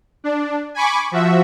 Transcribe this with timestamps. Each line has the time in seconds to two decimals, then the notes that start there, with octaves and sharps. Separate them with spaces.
0.24 D4
0.74 G#5 B5 C#6 D6
1.11 F3 F#4 E5